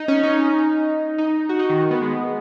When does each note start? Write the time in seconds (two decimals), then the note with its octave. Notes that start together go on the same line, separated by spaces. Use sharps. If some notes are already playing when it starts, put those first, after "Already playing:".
Already playing: D#4
0.08 C#4
0.23 D#4
1.18 D#4
1.49 F#4
1.59 D#4
1.70 D#3
1.91 B3
2.02 G#3